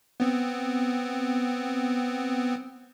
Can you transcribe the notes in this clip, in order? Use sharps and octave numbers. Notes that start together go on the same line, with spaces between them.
B3 C4